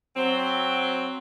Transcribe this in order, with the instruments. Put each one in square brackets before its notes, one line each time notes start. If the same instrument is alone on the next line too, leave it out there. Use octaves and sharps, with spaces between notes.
[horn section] F#3 C4